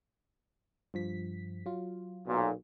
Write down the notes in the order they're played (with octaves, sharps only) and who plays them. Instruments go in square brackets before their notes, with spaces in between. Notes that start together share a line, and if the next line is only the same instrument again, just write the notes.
[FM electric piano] G2 F3 B6
F#3 F4
[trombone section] B1 A#2